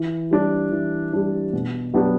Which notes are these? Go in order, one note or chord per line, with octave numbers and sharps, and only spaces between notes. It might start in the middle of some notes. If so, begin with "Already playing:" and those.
Already playing: E3
G3 D4
E3
G3 D4
B2
F#3 B3 D4 G4